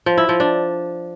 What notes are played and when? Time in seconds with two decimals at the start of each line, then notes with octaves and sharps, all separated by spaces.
0.06 F3
0.18 E4
0.29 F3
0.40 D4